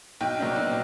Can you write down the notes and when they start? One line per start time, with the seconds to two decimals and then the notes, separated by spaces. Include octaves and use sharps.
0.21 B1 G5
0.39 A#2 F#3 B3 D4
0.56 B1